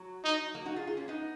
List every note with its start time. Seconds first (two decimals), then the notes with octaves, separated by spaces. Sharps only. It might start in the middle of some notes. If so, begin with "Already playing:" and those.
Already playing: F#3
0.24 D#4
0.55 F#3 A#3
0.65 D#4 F#4
0.76 F4 G#4
0.87 F4 G#4
0.97 A#3 C#4
1.08 B3 D#4